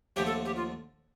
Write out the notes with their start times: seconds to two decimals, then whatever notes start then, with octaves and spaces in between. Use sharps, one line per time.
0.16 D#2 D3 F3 A3 D4 G4
0.26 A4
0.45 G4
0.56 F4